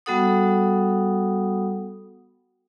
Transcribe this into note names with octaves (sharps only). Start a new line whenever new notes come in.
G3 B3 F#4 A4 F#5 D#6